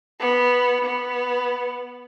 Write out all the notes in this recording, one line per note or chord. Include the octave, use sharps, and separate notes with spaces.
B3
B3